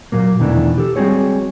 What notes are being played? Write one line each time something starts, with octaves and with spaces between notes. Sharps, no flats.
A#2 F#3 A#3
E2 B2 D#3 E3 A3 D4
G4 A4
G3 G#3 C4 F#4 G#4 C#5